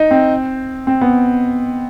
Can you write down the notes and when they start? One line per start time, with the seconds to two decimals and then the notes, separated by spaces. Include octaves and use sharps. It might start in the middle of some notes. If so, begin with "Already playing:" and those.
Already playing: D#4
0.11 C4
0.87 C4
1.01 B3